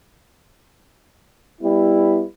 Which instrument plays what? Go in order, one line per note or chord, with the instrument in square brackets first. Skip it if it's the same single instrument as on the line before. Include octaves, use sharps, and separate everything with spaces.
[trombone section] G3 B3 E4